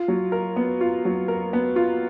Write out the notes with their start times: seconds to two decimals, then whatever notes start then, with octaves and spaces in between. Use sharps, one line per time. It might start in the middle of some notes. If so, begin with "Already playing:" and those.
Already playing: F4
0.08 F#3
0.32 A#4
0.56 B3
0.81 F4
1.05 F#3
1.28 A#4
1.53 B3
1.76 F4